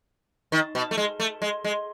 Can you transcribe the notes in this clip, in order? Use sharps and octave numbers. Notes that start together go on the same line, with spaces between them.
D#3
B2
A3
G#3
A3
G#3
G#3